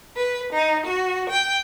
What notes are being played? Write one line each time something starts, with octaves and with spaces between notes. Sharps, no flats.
B4
D#4
F#4
G5